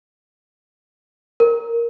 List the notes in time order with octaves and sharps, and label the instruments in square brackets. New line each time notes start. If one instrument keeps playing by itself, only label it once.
[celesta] A#4